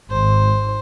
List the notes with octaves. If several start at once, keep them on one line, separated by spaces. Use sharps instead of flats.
G#1 C5